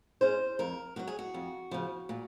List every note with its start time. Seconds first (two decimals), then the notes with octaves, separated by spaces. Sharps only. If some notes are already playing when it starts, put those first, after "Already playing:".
0.21 G#3 C#4 C5
0.59 F2 A#4
0.96 D#3 F#3 F#4
1.07 G#4
1.19 F#4
1.34 F2
1.71 C#3 F3
2.09 A#2